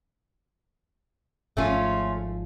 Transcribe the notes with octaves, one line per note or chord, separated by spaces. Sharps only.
G#1 F3 A3 C#4 F4